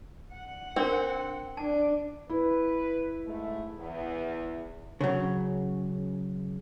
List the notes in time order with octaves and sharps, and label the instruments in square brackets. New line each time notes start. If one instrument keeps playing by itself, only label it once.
[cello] F#5
[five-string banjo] C4 [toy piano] D4 F4 A#4
[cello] D4 [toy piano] A5
[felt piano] E4 [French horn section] B4
[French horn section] G#2 A3
E2
[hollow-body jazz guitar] C#3 F#3